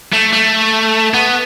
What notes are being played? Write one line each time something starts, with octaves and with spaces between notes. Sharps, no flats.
A3
A3
B3